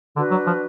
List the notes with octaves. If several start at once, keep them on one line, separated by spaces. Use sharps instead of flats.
D3 D4 F#4 B4
F#3
F3